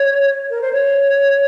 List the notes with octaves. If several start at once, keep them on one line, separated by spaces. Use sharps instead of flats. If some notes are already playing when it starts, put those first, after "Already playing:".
Already playing: C#5
A#4
C5
C#5